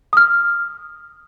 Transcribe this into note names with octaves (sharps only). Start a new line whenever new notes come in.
D#6 F6